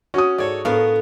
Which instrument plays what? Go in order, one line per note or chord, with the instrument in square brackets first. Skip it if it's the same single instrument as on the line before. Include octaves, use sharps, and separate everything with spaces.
[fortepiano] C#4 [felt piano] F#4 D#6
[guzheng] G#2 [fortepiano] A4 C#5 D5
[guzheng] A2 D4 D5 [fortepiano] B3 A#4 F5